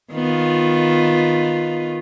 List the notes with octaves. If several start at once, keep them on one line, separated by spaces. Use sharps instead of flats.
D#3 B3 F4